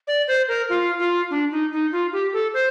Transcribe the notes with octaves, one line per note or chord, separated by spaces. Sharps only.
D5
C5
A#4
F4
F4
D4
D#4
D#4
F4
G4
A4
C5